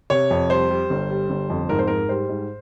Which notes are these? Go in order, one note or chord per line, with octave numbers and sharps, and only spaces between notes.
C3 C#5
F2
G3 C5
G3
G1
G3
G1
F2
G#2 A#4
C5
G#2 A#4
G3 C5
G#2